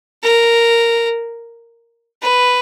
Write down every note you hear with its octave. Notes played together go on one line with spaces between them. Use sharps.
A#4
B4